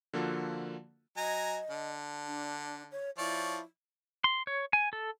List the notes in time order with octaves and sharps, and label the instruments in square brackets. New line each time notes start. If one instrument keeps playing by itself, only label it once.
[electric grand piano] D3 F3 A#3 F4 F#4 A4
[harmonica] F#3 G#5 A#5 [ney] D#5
[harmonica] D3
[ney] D4
C#5
[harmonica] F3 C#5 D5 [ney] E4
[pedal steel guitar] C6
C#5
G#5
A4